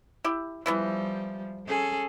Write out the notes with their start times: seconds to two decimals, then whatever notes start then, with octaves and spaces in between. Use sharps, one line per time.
0.24 E4 G4
0.66 E3 F3 G3 B3 E4
1.67 C#4 G#4 A4